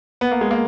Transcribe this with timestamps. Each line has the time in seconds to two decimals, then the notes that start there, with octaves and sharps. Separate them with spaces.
0.21 B3
0.31 A#3
0.41 G#3
0.51 A#3